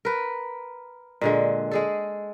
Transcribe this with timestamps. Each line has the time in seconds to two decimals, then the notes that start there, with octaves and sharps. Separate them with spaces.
0.05 A#4 B4
1.21 A#2 D3 G#3
1.71 G#3 G#4 A4